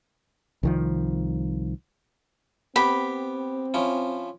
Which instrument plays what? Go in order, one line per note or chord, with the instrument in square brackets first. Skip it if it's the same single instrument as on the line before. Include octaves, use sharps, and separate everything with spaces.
[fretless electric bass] C2 D#3 F3
[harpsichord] B3 G4 [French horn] C4 [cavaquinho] B5
[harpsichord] F3 C#4 E4